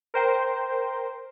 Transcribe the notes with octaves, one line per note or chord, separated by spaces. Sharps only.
A#4 C5 G5